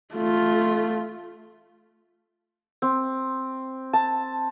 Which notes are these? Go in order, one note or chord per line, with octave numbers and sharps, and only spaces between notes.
A3 F4
C4
A5